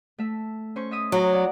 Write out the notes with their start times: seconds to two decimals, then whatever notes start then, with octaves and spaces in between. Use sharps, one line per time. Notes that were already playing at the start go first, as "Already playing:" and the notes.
0.18 A3 E5
0.76 C#4 C5 C#6
0.91 D#5 E5 D#6
1.12 F#3 F#4 A#5 D#6
1.33 D5 F#5